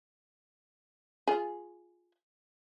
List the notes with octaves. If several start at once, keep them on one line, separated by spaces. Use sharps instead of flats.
F4 G#4